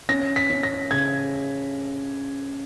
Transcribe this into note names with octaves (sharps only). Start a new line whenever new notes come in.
C#4 A#6
B6
C#4
A#6
C#3 G#6